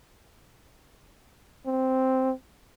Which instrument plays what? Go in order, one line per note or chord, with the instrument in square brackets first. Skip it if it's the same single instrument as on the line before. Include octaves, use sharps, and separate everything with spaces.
[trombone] C4